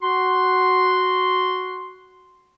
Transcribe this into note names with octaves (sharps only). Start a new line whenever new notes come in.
F#4 C6